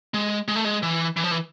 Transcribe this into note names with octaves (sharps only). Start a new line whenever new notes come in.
G#3
G#3
A3
G#3
E3
E3
F3
E3